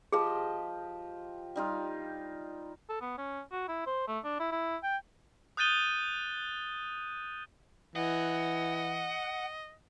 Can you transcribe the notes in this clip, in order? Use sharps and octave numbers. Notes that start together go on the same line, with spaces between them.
F3 G4 G#4 D#5
G3 D#4 F4
A4
B3
C#4
F#4
E4
C5
A3
D4
E4
E4
G5
D#6 F#6 G6 A6 D#7 G7
E3 D#5 F#5